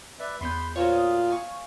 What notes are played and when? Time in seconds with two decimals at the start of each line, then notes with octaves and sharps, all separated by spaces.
0.20 B4 D5 E5
0.41 E2 B3 B5 C6 G6
0.76 A#2 F4 F#4 C5 C#5
0.92 D#6
1.30 F5 G#5 C#6